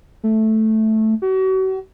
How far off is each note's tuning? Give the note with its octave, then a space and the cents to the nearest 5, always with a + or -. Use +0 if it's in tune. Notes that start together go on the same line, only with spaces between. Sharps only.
A3 -5
F#4 +40